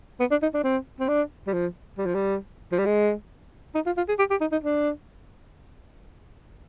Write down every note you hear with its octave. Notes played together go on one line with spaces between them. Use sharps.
B3
D4
D#4
D4
C4
C4
D4
G3
F3
G3
F3
G3
F3
G3
G#3
D#4
F4
F4
G#4
G4
G4
D#4
D#4
D4